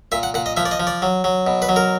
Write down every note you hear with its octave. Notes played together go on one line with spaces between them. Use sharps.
A#2 E5
F#5
A#2 F#5
D#5
F3 E5
D5
D#5
F3
D5
F#3
F#3
B2
B4
F#3
A#4